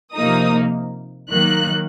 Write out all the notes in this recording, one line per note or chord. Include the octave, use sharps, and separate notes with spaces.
C3 F3 A#3 D#4 D#6
D#3 F#3 A#3 F#6